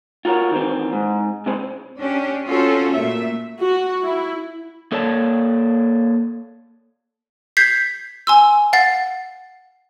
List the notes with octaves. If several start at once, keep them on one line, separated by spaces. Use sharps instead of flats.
F4 F#4 A#4 B4 C#5
D#3 E3 C4
G#2
C3 G#3 C4 C#4 C5 B5
C#4 D4 G4
C4 C#4 F4 F#4 A4 C5
A#2 A3 E5
F#4
E4
A#3 A4 C#5 D5 A5
G6 G#6 B6 C7
G#5 C6 E6
F5 F#5 A6 C7